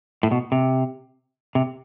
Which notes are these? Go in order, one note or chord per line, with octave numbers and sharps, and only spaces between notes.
A2
B2
C3
C3